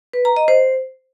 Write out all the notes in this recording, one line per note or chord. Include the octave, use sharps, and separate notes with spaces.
B4
A#5
D#5
C5